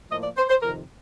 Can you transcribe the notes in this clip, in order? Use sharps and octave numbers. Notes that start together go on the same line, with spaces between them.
A2 F3 A#3 D#5
D5
C5
C5
F2 C3 D#3 A#4